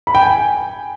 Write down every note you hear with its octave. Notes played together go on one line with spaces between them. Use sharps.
B5
G5
G#5